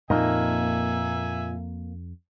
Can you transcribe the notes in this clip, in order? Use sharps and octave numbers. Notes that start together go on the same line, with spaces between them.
F2 A#2 A#3 D#4 E5 G#5